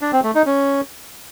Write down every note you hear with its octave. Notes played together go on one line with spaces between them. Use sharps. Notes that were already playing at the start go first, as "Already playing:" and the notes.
D4
C4
A3
D#4
C#4